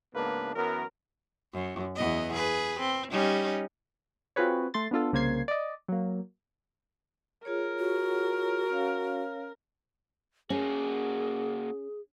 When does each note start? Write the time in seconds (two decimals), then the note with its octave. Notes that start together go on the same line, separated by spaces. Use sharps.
0.14 C#2 G#2 A#3 B3 D4 B4
0.55 F#2 E3 F#3 B3 A#4
1.53 F#2
1.95 E2 B3 D#5
2.32 G#4 B4
2.80 C4
3.11 G3 C#4 D#4
4.36 C4 F4 F#4 G#4 B4 C#5
4.74 A3 C6 A6
4.91 B3 D4 F4 A4
5.12 C2 C#3 A#3 C5 G#6 C7
5.48 D5 D#5
5.88 F#3 A#3
7.45 F4 G#4 A#4 C#5
7.79 F#4
8.70 C#4 C#5 F5
10.50 A#3 C#4 F#4 G#4